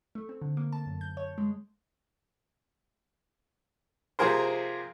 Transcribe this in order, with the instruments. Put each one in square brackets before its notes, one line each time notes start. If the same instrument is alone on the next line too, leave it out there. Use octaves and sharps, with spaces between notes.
[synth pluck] A3
C4
D3
A#3
A5
F#2
G6
C#5
G#3
[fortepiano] C3 F3 A#3 G#4 A#4 C5